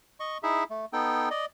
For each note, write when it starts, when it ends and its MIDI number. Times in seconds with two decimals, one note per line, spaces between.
0.20 0.38 75
0.20 0.38 85
0.43 0.64 63
0.43 0.64 64
0.43 0.64 68
0.43 0.64 76
0.70 0.85 57
0.93 1.29 59
0.93 1.29 63
0.93 1.29 69
0.93 1.29 79
1.31 1.46 74
1.31 1.46 75